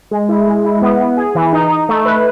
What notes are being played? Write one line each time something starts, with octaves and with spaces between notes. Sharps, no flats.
G#3
E4
G#3
E4
B3
B3
G#4
E3
D#4
D#4
A3
B4